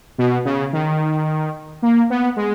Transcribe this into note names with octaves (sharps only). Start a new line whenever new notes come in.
B2
C#3
D#3
A#3
B3
G#3